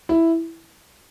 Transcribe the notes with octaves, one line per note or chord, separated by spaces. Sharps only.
E4